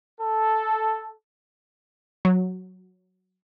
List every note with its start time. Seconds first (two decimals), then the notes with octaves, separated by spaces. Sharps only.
0.21 A4
2.25 F#3